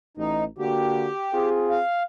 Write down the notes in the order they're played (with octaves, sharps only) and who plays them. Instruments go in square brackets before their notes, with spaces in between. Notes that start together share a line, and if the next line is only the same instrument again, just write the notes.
[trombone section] A1 [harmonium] D#4
[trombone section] D3 A#3 F#4 [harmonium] G4
[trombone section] C4 F4 G#4
[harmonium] F5